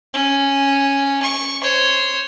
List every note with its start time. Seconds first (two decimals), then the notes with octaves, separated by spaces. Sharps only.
0.14 C#4
1.22 C#6
1.62 C5 C#5